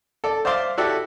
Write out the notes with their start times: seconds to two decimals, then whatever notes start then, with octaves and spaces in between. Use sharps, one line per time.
0.24 A4 D5
0.45 C5 D5 E5 F5 C6 D6
0.77 E4 F#4 G4 A4 D5 E6